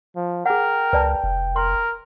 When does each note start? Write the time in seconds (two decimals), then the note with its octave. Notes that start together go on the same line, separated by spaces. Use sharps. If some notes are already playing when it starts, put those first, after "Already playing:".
0.16 F3
0.46 G#4 A#4 F#5 G5
0.93 C#2 B4 D5 A5
1.24 F1
1.56 A#4 C6